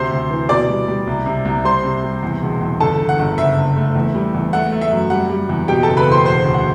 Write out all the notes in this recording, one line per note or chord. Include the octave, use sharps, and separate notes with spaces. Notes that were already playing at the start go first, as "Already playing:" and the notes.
Already playing: D2 C3 C5 C6
D2
E3
B2 D5 D6
G3
G3
C2
C3
C2
G3 C5 C6
C3
G3
E2
E1
E2
G1 A4 A5
D3
F#5
G1
F#1 E5
F#1
A3
E2
G3
E2
A3 F#5
A3
E5
F#2
G3 F#5
G3
E2
B2 G4 G5
F#1 A4 A5
B4 B5
E2
C5 C6
E1 C5 C6
D2
F#5